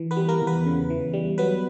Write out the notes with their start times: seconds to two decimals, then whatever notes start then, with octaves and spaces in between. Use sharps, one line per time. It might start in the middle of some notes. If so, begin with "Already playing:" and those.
Already playing: E3
0.11 B3 B4
0.17 G3
0.28 A#3 A#4
0.42 E2
0.47 B3 B4
0.66 C#3
0.90 E3
1.13 G3
1.38 F#3 B3 B4